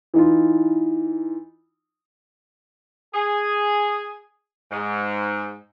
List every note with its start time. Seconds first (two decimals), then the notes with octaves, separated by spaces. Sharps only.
0.14 E3 D#4 F4
3.14 G#4
4.71 G#2